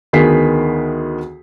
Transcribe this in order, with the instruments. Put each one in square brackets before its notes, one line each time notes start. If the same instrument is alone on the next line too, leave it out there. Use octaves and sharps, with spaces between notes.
[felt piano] D2 D#3 B3 G#4 B6 C7